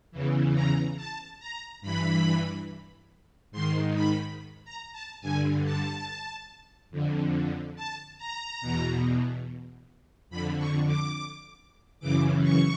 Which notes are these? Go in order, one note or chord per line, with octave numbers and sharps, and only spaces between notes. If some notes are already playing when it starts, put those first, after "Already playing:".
E2 C#3 E3
A#5
A5
A#5
G2 E3 B5
G#2 D#3 C6
B5
A#5
A5
G2 D3 G#5
A5
F2 D3
A5
A#5
E2 B2
F2 D3 B5
C#6
D6
F#2 C#3 E3 D6
C#6